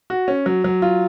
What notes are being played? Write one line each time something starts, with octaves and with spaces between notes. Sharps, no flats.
F#4
C#4
F#3
F#3
F4